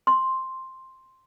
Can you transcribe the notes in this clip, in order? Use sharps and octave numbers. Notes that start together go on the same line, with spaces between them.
C6